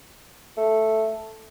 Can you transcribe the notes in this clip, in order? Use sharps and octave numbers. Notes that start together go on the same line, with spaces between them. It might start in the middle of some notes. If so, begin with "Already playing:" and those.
A3